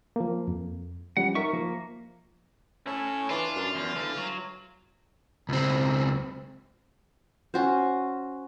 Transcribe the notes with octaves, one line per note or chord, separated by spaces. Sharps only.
F3 A#3
F2
F3 G3 C#4 F#5
D#4 A#4 E5 C#6
F3 A#3
C#4 E4 A4
E3 D4 F4
F#2
E2
D3 E3
F#3
C#2 C4
C#4 F#4 C5